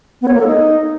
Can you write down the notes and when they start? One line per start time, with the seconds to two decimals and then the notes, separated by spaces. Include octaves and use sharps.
0.22 B3
0.28 C#5
0.34 A#3
0.41 A4
0.47 D#4